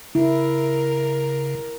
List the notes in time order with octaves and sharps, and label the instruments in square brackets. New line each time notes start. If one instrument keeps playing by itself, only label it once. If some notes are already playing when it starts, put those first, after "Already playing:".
[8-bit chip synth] C#3 [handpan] E4 [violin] A#4